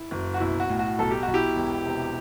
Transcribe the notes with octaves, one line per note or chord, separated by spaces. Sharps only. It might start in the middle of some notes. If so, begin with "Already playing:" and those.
Already playing: E4
F#1
F#4
B1 E4
F#4
A2
F#4
B1 A4
G4
B1 F#4
E4 G4
E1
C3